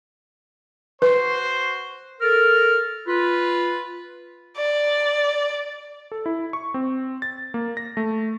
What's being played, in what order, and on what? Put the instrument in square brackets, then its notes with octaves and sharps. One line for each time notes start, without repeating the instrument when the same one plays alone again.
[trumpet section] F#4 C5 C6 [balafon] B4
[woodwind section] A4 A#4 F6
F4 B4
[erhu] D5
[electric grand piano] A4
E4
C#6
C4
A6
A#3
A#6
A3